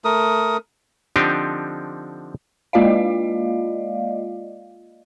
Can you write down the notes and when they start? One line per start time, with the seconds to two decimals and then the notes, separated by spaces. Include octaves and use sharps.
0.05 A3 A#4 D#6
1.16 D3 F3 C4 D4 D#4 G4
2.73 G#3 A#3 F4 D5 D#5 F5